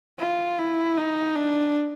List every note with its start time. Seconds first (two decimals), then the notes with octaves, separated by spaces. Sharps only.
0.19 F4
0.58 E4
0.97 D#4
1.36 D4